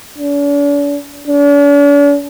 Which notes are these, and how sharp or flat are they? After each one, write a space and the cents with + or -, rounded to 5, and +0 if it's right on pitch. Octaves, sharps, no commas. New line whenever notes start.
D4 -45
D4 -45